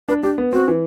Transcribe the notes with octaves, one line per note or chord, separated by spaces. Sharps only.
D4 B4
D4 G4
B3
C4 F#4
E3